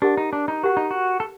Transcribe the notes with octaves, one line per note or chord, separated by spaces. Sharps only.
D4 G4 A#4 F#5
D#4
D4
D#4
F#4 G4 A#4 F#5
D#4
F#4
A4